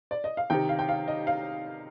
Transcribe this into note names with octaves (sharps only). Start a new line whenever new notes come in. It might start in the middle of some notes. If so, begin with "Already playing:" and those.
D5
D#5
F5
C3 D#3 G5
F5
G5
F5
D#5
F5